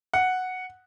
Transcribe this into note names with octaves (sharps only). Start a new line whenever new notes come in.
F#5